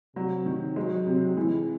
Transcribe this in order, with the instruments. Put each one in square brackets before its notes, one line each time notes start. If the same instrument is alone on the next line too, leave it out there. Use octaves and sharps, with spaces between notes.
[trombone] C3 [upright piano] F#3
[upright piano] D#3
[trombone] F#3 [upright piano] G#3
[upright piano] C3
[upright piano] E3 [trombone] G#3